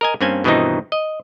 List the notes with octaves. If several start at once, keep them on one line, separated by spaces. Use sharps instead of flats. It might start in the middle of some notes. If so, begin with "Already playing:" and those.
A#4 D#5 G#5
G2 A#3 C4 C#4 G#5
G2 B2 D#3 E3 C4 D#4
D#5